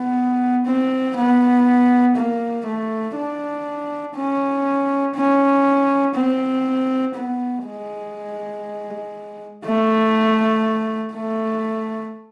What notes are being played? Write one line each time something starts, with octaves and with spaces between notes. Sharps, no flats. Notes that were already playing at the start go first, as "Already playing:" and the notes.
Already playing: B3
C4
B3
A#3
A3
D4
C#4
C#4
C4
B3
G#3
A3
A3